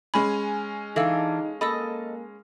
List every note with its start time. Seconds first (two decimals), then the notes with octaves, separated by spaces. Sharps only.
0.14 G#3 C#4 G#5 B5
0.96 E3 D4 D#4 A4 F5 E6
1.61 A#3 A4 D#5 B5 E6